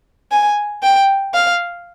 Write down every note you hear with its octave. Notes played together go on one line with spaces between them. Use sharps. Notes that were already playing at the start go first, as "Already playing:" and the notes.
G#5
G5
F5